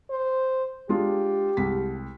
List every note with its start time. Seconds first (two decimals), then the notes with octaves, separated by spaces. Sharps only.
0.10 C5
0.89 G#3 D4 F4 G4
1.57 C2 G#3 B6